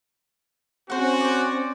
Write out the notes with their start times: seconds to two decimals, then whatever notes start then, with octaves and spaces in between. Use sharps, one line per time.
0.90 C4 C#4 F#4 C5 F#5
1.21 C5 D5